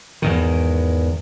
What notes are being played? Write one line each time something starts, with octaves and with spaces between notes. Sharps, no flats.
E2 G#2 D#3